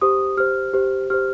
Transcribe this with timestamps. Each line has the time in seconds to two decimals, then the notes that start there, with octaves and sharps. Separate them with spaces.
0.02 G4 C5 D#6
0.37 G4 C5 F6
0.74 G4 C5
1.10 G4 C5 F6